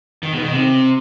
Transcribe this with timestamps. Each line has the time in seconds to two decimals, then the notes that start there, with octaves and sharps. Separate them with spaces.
0.23 D#3
0.33 B2
0.43 D#3
0.53 C3